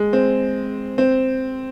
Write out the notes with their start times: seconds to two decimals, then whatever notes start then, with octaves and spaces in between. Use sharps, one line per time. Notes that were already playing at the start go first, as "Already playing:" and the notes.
Already playing: G#3
0.13 C4
0.98 C4